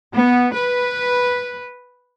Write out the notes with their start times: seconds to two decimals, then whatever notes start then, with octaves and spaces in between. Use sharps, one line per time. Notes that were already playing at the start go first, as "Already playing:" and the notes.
0.14 B3
0.54 B4